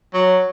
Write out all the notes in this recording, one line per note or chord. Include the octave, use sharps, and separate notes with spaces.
F#3